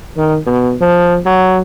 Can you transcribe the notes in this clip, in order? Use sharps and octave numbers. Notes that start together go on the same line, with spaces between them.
D#3
B2
F3
F#3